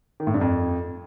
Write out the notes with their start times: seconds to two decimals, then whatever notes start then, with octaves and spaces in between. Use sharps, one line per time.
0.20 D#3
0.27 A2
0.34 G2
0.41 F2